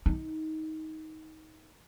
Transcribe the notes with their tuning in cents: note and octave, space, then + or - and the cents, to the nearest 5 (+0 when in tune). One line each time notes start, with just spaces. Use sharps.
D#4 +20